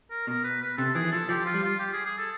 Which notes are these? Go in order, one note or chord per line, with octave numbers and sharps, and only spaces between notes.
A#4
B2 A#4
B4
B4
C3 A4
E3 G#4
E3
F3 A4
F3 G4
F4
G3
F4
G4
G#4
G#4
A4